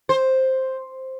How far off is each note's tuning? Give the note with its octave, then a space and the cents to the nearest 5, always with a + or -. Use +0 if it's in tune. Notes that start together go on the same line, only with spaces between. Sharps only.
C5 +5